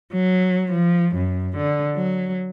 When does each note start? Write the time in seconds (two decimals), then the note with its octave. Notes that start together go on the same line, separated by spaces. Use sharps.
0.13 F#3
0.72 F3
1.15 F#2
1.57 D3
1.96 F#3